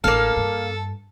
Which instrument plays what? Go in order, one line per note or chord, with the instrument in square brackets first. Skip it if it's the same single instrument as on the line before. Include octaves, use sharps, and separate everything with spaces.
[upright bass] A1 D4 [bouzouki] A#3 F5 [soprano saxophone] A4
[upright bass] G2